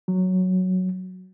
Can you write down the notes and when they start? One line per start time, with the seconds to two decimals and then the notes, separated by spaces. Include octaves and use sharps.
0.08 F#3